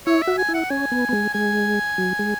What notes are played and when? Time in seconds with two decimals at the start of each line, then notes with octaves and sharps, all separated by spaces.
0.06 E4 C#5
0.22 E5
0.27 F#4
0.38 G#5
0.48 E4
0.54 F#5
0.70 C#4 G#5
0.92 B3
1.09 B3
1.12 G#3
1.33 G#3 G#5
1.98 F#3
2.19 G#3